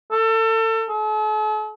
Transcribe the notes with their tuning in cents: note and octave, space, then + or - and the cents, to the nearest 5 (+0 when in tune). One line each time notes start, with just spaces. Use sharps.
A4 +30
A4 -45